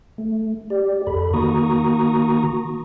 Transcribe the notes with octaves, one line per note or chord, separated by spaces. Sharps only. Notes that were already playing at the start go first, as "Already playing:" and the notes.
A3
G4 D5
F2 A4 B5
D#3 A#3 F#4 A#5 C#6 D#6